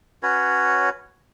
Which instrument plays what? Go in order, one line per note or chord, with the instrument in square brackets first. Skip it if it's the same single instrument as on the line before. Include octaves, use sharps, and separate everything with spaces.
[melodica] C#4 F#4 B4 C#5